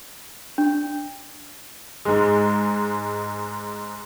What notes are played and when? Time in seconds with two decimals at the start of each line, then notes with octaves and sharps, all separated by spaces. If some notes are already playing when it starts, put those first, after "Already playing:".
0.58 D4
2.05 G#2 G#3